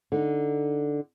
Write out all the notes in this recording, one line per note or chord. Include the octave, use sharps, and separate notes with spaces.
D3 D#4